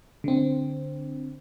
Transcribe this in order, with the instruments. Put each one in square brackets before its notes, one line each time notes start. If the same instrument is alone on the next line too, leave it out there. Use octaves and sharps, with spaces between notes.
[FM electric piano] D3 C4